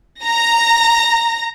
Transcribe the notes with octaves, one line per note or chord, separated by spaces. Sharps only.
A#5 A#6